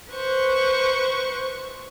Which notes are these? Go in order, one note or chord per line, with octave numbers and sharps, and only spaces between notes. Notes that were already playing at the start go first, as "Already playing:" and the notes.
B4 C5 C#6